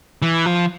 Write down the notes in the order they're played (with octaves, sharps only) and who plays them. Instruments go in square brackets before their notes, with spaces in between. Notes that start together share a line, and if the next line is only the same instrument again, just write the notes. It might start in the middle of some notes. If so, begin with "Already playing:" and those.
[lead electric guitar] E3
F3